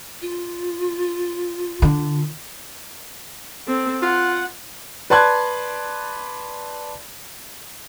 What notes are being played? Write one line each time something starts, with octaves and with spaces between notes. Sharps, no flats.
F4
D3
C4 A4
F4 F#5
B4 D5 A5 C6 F#6 G#6